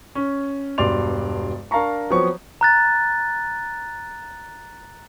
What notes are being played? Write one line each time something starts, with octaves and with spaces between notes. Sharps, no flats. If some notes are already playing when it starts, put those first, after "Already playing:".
C#4
E1 G2 B2 D5 C6 F7
D4 A#4 F5 A5 A#5 C#6
F3 F#3 B3 C4 C#5 C#6
A#5 F#6 A6